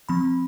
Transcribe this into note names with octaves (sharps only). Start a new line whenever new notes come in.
F3 C4 B5